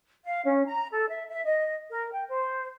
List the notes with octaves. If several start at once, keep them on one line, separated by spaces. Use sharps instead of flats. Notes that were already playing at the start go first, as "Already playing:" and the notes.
F5
C#4
A#5
A4
E5
E5
D#5
A#4
G5
C5